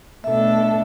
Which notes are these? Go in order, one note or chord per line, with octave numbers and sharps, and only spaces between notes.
B2 A3 D4 A4 E5